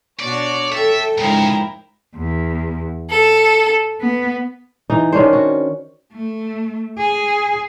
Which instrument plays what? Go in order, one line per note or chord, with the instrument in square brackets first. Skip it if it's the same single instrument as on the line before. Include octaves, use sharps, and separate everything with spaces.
[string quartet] B2 D4 F#4 [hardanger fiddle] C#5 [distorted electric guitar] D5
[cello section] A4 [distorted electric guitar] E5 [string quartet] G5
[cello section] G#2 [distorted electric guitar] C#3 [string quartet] F3 E4 A#4 [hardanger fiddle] G5 A#5
[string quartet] E2
A4
B3
[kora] E3 D#4
D#3 C#4 D4 C5
F#4
[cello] A3
G#4